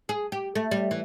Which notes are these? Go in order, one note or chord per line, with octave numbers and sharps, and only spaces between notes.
G#4
G4
A3
G3
E3